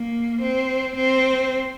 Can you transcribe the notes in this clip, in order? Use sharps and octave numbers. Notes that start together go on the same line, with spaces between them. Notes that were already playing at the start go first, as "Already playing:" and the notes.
Already playing: A#3
C4
C4